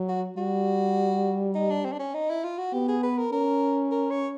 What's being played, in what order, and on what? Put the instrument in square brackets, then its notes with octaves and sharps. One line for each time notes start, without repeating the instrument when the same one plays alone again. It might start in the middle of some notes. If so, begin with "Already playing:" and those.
Already playing: [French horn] F#3
[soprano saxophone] F#4
[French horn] G3 [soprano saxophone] F#4
[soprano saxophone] D#4
D4
C4
D4
C#4
D#4
E4
F4
F#4
[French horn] B3 [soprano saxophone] G4
[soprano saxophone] G#4
B4
A#4
[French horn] C#4 [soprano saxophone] A#4
[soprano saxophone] A#4
C#5